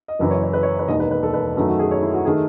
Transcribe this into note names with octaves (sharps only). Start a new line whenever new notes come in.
D#5
F#1 F#2 E3
C#5
C#5
B4
C#5
B4
E1 D#2 D#3 D#5
B4
B4
A4
B4
F#2 D#3 F#3 A3
F#4
G#4
C#5
E4
F#4
D#3 A3 G#4